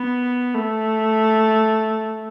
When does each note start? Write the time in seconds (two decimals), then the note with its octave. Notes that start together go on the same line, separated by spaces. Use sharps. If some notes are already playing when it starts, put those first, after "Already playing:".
Already playing: B3
0.55 A3